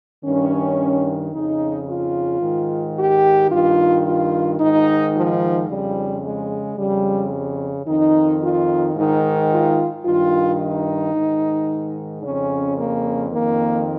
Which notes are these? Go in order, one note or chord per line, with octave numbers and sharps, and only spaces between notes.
G2 D#3 C#4
F2 C#3 D#4
F4
G#2 D#3
G4
G2 D#3 F4
F4
G#2 D#3 D#4
F3
F2 C#3 G3
G#3
F2 C#3 G3
F2 D#3 D#4
F4
G#2 D#3 D#4
F4
G2 D#3 F4
D#4
G#2 D#3
F2 C#3 C#4
A#3
F2 D#3 A#3